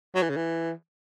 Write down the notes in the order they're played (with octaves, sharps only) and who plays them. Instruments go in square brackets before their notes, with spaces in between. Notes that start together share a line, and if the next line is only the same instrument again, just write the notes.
[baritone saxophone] F#3
E3
C#3
E3